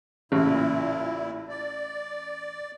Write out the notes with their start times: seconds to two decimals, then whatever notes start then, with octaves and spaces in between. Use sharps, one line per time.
0.32 A1 A#2 C#3 E4
1.48 D5